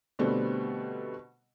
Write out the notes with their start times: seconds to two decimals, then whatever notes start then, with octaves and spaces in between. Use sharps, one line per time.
0.19 B2 D3 G3 A3 B3 C4